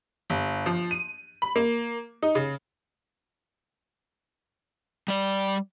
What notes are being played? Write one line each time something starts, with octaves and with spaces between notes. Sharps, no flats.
G1
F3
D#7
B5
A#3
D#4
C#3
G3 D5